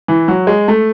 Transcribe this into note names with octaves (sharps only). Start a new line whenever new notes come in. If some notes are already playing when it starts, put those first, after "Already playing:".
E3
F#3
G#3
A3